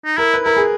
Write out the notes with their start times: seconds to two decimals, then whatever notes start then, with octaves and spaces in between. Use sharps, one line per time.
0.05 D#4
0.18 E4 A#4
0.34 B4
0.44 E4 A#4
0.57 G#4